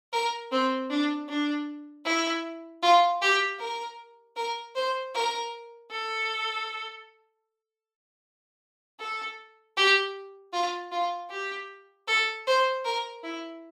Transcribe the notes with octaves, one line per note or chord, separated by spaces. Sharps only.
A#4
C4
D4
D4
E4
F4
G4
A#4
A#4
C5
A#4
A4
A4
G4
F4
F4
G4
A4
C5
A#4
E4